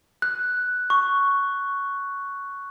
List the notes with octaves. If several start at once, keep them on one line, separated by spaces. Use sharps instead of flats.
F#6
C#6